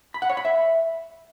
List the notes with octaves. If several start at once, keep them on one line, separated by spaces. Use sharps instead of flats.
B5
F#5
C#5
B5
E5